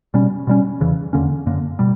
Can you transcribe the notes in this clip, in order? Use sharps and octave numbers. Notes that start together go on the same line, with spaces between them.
B2 G3 C#4
B2 G3 C#4
E2 C#3 E3
E2 D3 A#3 C#4
F#2 D3 A#3
B2 G3